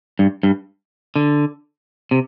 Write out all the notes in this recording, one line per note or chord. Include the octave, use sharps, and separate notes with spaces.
G2
G2
D3
C3